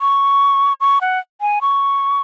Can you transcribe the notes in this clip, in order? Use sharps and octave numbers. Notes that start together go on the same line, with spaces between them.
C#6
C#6
F#5
G#5
C#6